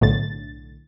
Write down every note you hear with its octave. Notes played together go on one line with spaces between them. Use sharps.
B1 A2 D3 A6